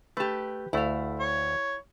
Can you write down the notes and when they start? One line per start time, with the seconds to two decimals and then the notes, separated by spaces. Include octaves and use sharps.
0.17 A3 G4 B4 A5
0.73 D2 A3 E4 F5
1.20 C#5